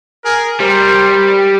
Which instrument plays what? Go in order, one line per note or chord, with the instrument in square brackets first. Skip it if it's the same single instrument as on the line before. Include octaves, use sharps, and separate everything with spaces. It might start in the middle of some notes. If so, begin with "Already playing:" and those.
[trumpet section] G#4 A#4
[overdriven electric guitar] G3 [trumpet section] A#4 C5